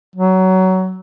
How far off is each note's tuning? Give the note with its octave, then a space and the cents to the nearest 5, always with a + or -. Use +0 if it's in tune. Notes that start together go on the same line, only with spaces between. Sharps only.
F#3 +20